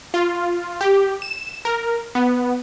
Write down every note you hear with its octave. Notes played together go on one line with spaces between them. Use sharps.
F4
G4
E7
A#4
B3